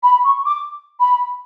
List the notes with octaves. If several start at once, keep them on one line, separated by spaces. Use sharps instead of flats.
B5
C#6
D6
B5